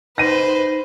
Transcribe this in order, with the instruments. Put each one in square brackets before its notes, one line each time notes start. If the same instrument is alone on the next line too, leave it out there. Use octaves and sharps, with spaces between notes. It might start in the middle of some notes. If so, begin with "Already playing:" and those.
[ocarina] D#4 [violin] B4 C5 [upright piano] A#6 D#7